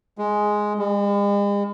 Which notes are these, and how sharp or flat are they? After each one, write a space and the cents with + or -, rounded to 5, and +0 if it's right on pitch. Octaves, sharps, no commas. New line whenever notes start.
G#3 +5
G#3 -45